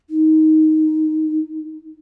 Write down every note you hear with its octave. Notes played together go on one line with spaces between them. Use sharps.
D#4